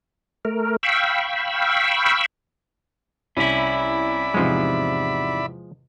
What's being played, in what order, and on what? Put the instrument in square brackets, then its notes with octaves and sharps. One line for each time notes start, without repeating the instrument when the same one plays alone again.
[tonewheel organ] A3 A#4
F5 G5 B5 C#6 E6
[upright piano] C2 [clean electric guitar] C#4 E4 [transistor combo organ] D5 E5 B5
[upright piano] E2 G#2 C3 [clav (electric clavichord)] F3 G#3